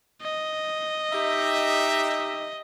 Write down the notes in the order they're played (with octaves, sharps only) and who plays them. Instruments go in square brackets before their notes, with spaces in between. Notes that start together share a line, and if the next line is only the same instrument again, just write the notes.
[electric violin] D#5
[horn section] D#4 G4 E5